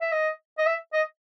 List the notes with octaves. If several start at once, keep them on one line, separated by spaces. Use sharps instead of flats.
E5
D#5
D#5
E5
D#5